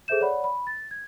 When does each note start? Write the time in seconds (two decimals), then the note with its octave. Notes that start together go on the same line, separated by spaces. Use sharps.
0.08 G#4 A4 C5 E5 G6 E7
0.21 C#5 D5 F#5 B5
0.44 B5
0.67 A6
0.91 G#6